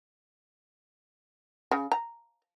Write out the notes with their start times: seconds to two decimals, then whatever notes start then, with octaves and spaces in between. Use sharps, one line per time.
1.71 C#3
1.92 A#5